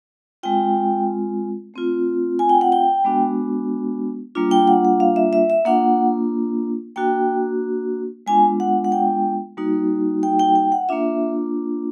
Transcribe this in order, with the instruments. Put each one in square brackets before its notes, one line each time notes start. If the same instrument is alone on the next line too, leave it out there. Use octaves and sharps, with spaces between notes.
[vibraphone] G#3 C4 F4 G5
A3 C4 F4
G#5
G5
F#5
G5
G#3 B3 D4 F#4
G3 A#3 D4 F4
G5
F#5
F#5
F5
E5
E5
E5
A#3 D4 F4 F#5
A#3 D4 F#4 G5
G#3 B3 D4 F4 G#5
F#5
F#5
G5
G3 A#3 D#4 F#4
G5
G5
G5
F#5
A#3 D4 F4 E5